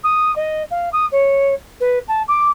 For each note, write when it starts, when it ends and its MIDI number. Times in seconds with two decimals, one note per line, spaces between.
0.03 0.34 87
0.36 0.63 75
0.70 0.89 77
0.92 1.06 87
1.11 1.54 73
1.80 1.98 71
2.08 2.22 81
2.28 2.49 86